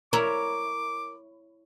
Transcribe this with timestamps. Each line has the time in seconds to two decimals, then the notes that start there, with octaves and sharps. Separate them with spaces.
0.13 E4 A#4 C#5 D6